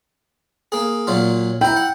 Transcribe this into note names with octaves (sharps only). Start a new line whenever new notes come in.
A#3 G#4
A#2 F#3 F4
E4 G5 A#5
F#5